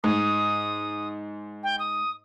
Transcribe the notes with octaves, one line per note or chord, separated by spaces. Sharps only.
G#2 D#6
G5
D#6